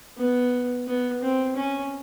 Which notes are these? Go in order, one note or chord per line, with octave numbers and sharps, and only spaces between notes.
B3
B3
C4
C#4